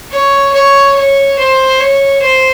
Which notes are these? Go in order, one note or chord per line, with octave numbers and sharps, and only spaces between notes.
C#5
C#5
C#5
C5
C#5
C5